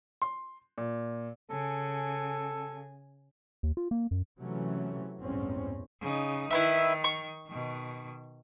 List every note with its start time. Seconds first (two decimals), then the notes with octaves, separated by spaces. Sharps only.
0.22 C6
0.78 A#2
1.51 C#3 A4 G#5
3.63 D#2
3.77 F4
3.91 A#3
4.11 F#2
4.41 C3 E3 F#3 A3 C#4
5.20 A1 E2 G2 B2 C4 C#4
6.01 C#3 D#4
6.51 D#3 E4 B4 E5
7.04 C#6
7.48 B2 D#3